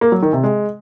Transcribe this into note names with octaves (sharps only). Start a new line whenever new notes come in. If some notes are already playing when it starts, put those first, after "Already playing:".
A#3
F#3
D#3
C3
G#3